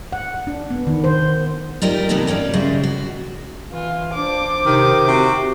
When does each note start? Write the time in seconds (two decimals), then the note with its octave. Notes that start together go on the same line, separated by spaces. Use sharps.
0.13 F#5
0.47 D4
0.70 B3
0.87 D#3
1.04 C5
1.82 G3 D#4 F4 G4 A#4
2.09 C3 E3 B3 D#4 F#4 A4
2.27 A#3 C#4 D#4 D5
2.54 C#3 G3 G#3 E4 G#4 C5
2.84 F#4
3.72 E3 F4
4.14 D4 C5 D6
4.65 C3 D#3
5.08 C3 F#4